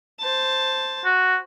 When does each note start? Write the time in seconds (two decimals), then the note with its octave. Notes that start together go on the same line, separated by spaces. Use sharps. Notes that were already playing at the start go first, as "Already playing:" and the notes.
0.20 C5 A5
1.05 F#4